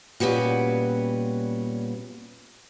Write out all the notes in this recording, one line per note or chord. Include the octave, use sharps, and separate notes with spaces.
A#2 G3 B3 C#4 F#4